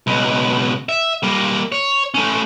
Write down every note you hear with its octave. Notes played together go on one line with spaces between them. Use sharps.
C#2 B2
E5
G3 A#3
C#5
A3 C#4